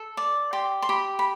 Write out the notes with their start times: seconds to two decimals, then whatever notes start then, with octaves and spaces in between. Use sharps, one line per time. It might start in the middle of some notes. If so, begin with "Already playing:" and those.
Already playing: A4
0.17 D5
0.53 G4 C6
0.82 C6
0.89 G4 B5
1.19 B5